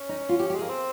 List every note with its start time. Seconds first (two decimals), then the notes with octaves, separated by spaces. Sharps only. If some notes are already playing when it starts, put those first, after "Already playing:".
Already playing: C#4
0.09 D#4
0.29 F4
0.39 G4
0.50 G4
0.54 G#3
0.59 A#3 G#4
0.69 C4